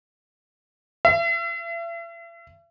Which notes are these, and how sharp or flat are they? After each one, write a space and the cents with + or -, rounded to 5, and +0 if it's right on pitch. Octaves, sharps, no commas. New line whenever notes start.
E5 +40